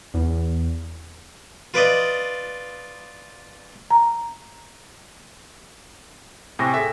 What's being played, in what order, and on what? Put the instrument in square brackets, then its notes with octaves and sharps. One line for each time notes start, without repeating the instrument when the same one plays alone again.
[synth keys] E2
[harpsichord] F4 B4 D5 D#5
[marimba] A#5
[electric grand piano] A2 C3 [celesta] G5 G#5 A#6 [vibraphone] C#6
[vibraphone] G#4 A4 [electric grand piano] E5